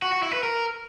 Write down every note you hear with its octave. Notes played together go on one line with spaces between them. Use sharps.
F#4
F#4
E4
B4
A#4